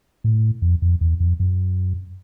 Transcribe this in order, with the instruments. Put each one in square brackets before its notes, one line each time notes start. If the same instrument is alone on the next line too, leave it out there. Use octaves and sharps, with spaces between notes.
[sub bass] A2
F2
F2
E2
F2
F#2